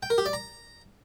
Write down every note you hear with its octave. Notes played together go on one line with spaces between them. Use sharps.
G5
A#4
G4
D5
A#5